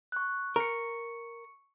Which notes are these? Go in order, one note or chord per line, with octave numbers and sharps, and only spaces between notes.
C#6 F#6
A#4 C#6 C#7